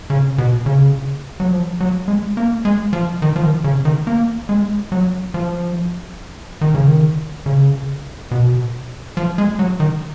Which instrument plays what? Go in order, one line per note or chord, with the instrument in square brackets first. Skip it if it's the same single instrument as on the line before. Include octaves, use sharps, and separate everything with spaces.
[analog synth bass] C#3
B2
C#3
F#3
F3
F#3
G#3
A#3
G#3
F3
D#3
F3
D#3
C#3
D#3
A#3
G#3
F#3
F3
D#3
C#3
D#3
C#3
B2
F3
G#3
F#3
D#3